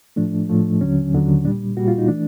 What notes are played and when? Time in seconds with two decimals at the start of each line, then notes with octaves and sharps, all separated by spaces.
0.16 A2 F3 A3 D4
0.49 A2 F3 A3
0.81 D#2 D3 F#3 C#4
1.13 D#2 D3 F#3
1.44 A#2 G3 D4
1.77 A#2 G3 F#4
1.88 F4
1.98 D#4
2.08 E3 A3 D4